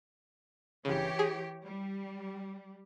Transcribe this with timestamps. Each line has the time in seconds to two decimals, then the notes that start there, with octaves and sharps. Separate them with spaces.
0.85 G1 C#3 E3 G4 C#5
1.19 G#4
1.63 G3